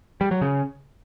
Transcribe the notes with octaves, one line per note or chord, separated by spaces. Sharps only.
G3
F#3
C#3